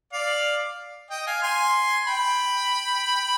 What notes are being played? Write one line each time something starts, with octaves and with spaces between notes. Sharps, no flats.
D5 F5
D#5 G5
F5 G#5
G#5 C6
G5 B5